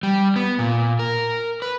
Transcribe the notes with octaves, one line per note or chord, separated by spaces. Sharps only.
G3
B3
A#2
A#4
B4